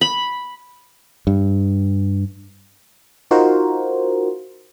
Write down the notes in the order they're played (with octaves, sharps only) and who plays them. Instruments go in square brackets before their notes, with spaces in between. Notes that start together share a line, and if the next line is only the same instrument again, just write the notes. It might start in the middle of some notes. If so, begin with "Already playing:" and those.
[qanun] B5
[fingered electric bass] G2
[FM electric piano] D#4 F4 F#4 A#4 C5